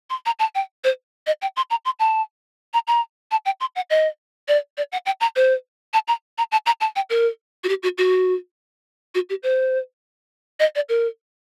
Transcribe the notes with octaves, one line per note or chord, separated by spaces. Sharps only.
C6
A#5
A5
G5
C5
D#5
G5
C6
A#5
C6
A5
A#5
A#5
A5
G5
C6
F#5
D#5
D5
D5
F#5
G5
A#5
C5
A5
A#5
A#5
A5
A#5
A5
G5
A#4
F#4
G4
F#4
F#4
F#4
G4
C5
D#5
D5
A#4